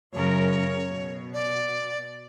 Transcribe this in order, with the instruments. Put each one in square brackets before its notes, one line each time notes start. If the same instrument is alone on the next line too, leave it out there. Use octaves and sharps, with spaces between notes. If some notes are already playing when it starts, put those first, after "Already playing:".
[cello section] F#2 C#3 A#4 [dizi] C#5
[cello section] B2
[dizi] D5